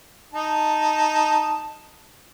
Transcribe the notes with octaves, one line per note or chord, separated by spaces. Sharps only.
D#4 A5